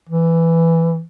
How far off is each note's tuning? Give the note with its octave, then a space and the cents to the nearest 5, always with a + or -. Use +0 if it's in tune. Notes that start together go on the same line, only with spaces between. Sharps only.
E3 +5